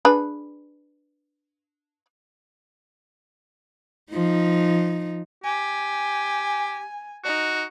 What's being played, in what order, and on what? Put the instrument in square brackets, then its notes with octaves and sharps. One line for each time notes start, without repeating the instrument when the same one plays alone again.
[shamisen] D4 G#4 B4
[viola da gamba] F3 D#4
[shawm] G4 [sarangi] G#5
[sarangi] D#4 [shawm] F#4